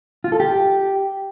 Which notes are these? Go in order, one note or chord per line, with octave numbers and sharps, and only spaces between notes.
F4
A4
G4